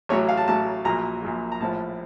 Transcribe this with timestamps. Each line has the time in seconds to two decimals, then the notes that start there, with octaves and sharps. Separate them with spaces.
0.09 A1 A2 F#3 C#5
0.29 F5
0.38 A5
0.48 A1 A2 F#3 A5
0.85 A#1 A#2 F#3 A#5
1.22 A#1 A#2 F#3
1.52 A#5
1.60 A#1 A2 F3 A5